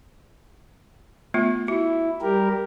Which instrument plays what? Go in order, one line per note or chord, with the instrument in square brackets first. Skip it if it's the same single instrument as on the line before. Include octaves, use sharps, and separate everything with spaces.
[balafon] A3 B3 F4
[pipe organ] E4 [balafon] F#4
[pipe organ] G3 G4 A#4